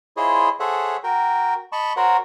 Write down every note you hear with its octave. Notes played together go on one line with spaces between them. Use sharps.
E4 F4 G#4 C5 C#5 D#5
G#4 A4 C5 C#5 E5 F#5
F#4 A#4 G5
D#5 A5 B5 C#6
F#4 A#4 C5 C#5 F#5